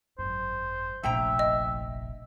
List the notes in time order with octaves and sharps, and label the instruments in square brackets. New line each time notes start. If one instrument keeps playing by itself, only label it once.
[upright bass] G#1 F#2 [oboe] C5
[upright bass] F1 A#1 [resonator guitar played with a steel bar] F3 G5 A#5 [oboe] E5
[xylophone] D#5